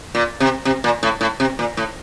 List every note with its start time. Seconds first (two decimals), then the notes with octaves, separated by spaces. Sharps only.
0.15 A#2
0.40 C3
0.65 C3
0.84 A#2
1.03 A2
1.21 A2
1.40 C3
1.59 A#2
1.77 A2